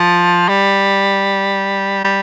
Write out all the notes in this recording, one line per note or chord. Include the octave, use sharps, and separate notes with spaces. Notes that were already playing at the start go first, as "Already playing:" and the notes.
Already playing: F3
G3
G3